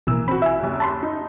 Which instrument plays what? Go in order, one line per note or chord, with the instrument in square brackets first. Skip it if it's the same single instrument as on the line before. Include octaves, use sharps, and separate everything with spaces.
[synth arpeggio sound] A1 B2 E6 [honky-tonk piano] E3 A#3
[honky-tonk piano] C4 F#4 [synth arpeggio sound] B5
[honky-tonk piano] E4 E6 [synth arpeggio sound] E5 G#5
[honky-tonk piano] F#1 D#2
[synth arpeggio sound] A5 B5 C6
[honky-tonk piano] D#4